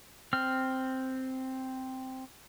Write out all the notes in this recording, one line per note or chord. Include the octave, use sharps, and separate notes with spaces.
C4 F6